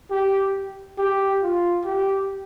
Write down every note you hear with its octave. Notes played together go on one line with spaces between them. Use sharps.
G4
G4
F4
G4